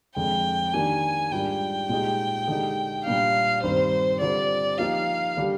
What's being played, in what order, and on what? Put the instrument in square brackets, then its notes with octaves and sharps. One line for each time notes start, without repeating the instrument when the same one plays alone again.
[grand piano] F2 D3 G#3 [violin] G5
[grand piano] D#3 A#3 D4 G4 [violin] G#5
[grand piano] G#2 G3 D4 F4 [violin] G5
[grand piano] A#2 G#3 D#4 G4
D3 G#3 D#4 G4
[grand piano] A#2 G3 A#3 D4 [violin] F5
[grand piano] G2 D#3 G3 C4 [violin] C5
[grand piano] D3 G3 C4 F4 [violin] D5
[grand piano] F3 A#3 D#4 G4 [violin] F5
[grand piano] D3 G3 D4 G4